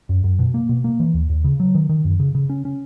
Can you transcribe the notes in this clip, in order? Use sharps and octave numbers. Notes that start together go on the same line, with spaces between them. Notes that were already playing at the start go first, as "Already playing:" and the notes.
F#2
F#2
B2
A#3
B2
A#3
E3
D#2
D#2
C#3
F#3
D#3
D#3
F#2
C#3
C#3
C#4
C#4